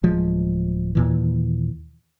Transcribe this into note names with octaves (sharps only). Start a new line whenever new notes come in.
D1 F3 G#3
D#2 A#2 E3